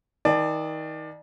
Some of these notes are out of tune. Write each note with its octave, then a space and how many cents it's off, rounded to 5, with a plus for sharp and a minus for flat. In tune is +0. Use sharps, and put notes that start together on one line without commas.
D#3 +30 D5 +25 A5 -25